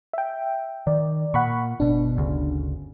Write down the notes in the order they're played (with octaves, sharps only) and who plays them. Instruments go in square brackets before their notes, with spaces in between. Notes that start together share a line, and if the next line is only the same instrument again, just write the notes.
[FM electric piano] E5 G5
[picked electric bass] D#3 [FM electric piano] D5
[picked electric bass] A#2 [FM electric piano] F#5 B5 C#6
[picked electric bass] G1 B2 [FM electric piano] D4
[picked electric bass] G1 D2 C#3